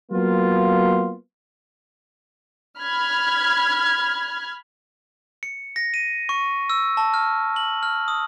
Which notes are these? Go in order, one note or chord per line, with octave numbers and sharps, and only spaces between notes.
F#3 A#3 B3 F4
B5 F6 G#6
C#7
A#6
D#7
C#6
E6
A5
F6
F#7
F6
D#6